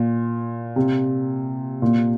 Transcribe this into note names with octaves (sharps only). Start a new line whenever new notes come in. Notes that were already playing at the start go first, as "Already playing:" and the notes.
Already playing: A#2
C3
A#2